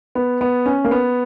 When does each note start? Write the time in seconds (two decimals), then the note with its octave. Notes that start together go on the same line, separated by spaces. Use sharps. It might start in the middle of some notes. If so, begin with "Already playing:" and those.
0.15 B3
0.41 B3
0.66 C#4
0.84 A#3
0.91 B3